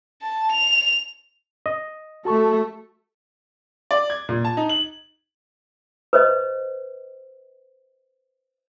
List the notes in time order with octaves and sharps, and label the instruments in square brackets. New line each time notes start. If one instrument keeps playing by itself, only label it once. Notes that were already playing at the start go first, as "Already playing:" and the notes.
[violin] A5
F7
[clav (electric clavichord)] D#5
[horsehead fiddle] A3 A4 [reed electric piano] F#4 A5 C#6
[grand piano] D5
G#6
A#2
A5
D#4
F#7
[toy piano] B4 C5 D#5